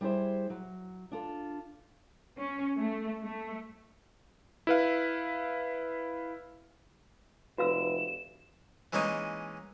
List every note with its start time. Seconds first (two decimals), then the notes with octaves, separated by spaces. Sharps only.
0.01 G3 E4 G#4 C5 E5
0.50 F#3
1.12 D4 F4 A4
2.38 C#4
2.79 A3
3.24 A3
4.67 E4 B4 F5
7.58 F1 F#4 B4 F5 E6 E7
8.93 E3 G#3 A#3 C#4 D#4